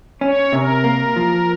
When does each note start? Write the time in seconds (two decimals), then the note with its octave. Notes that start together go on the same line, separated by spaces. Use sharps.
0.21 C#4 C#5
0.53 C3 A#4
0.84 A#3
1.16 F3